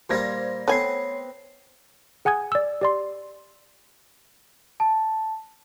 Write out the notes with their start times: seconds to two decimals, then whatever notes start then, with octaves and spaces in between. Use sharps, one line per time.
0.10 A#2 G3 F4 C5 G#6 A#6
0.68 A3 B3 C4 C#5 G#5 C7
2.25 G#4 F#5 G#5 D#6 G#6
2.52 D5 E6
2.81 G4 D5 C6
4.80 A5